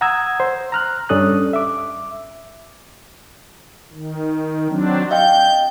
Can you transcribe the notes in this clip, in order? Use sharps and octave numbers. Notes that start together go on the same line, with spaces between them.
F#5 A#5 D#6 E6 G#6
C5
A#5 F6 F#6
G2 C#4 D4 A4 D#6 F#6
E5 D6
D#3
F#3 C4 D4
D#5 F5 G5 G6